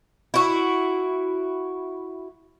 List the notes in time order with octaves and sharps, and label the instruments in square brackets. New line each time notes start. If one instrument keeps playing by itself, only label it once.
[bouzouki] E4 F#4